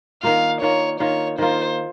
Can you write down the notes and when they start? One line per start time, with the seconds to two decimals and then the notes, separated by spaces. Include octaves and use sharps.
0.23 D#3 A#3 F4 F5
0.62 D#3 A#3 F4 C#5
1.00 D#3 A#3 F4 C#5
1.38 D#3 A#3 F4 C5